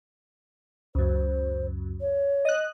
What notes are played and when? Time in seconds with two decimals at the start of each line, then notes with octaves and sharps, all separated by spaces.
0.95 C#2 F#2 C5
2.00 C#5
2.45 D#5 F#6